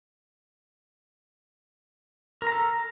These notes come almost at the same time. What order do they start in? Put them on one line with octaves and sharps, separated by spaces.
A#4 A#5 A4